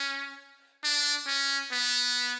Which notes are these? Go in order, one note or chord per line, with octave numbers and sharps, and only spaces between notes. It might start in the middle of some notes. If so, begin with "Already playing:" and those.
Already playing: C#4
D4
C#4
B3